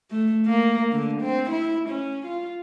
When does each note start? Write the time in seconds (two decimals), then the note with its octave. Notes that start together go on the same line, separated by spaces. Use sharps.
0.10 A3
0.46 A#3
0.91 D3
1.21 C4
1.50 E4
1.89 C#4
2.26 F4